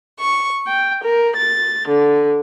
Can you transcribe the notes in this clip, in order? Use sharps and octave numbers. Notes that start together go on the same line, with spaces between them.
C#6
G5
A#4
A6
D3